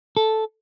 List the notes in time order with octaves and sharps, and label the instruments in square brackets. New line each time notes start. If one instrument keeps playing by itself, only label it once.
[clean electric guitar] A4